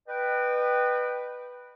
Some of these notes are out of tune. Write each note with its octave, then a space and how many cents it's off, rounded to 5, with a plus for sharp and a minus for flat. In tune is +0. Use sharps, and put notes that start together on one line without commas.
B4 +0 D#5 -35 G5 -10